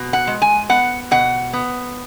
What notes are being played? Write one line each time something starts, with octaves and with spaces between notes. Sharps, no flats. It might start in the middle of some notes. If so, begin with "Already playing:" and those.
Already playing: B2
F#5
G#3
G#5
B3 F#5
B2 F#5
B3